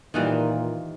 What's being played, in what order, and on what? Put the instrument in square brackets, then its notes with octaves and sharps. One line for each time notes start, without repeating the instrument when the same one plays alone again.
[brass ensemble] A#2 [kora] D#3 E3 G3